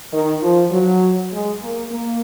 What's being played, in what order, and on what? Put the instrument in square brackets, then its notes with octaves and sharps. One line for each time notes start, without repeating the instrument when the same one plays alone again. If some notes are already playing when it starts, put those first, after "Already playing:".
[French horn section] D#3
F3
F#3
G#3
A#3
A#3